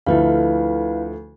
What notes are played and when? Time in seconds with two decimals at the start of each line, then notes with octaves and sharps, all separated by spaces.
0.07 D2 F3 A3 E4 B4 F5